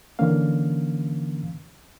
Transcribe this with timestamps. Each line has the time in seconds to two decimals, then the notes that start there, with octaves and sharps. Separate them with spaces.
0.19 D3 E3 F3 A#3 C#4 F5